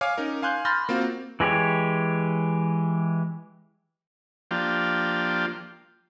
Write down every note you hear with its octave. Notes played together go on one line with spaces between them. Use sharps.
C#5 F5 G#5 D6 F6
C#4 D#4 A#4
F5 G#5 C6 F#6 G6
B5 C6 F6 G6 A6 A#6
A#3 C4 F4 F#4
E3 G#3 G4 C#5
F3 A#3 D4 F4 G4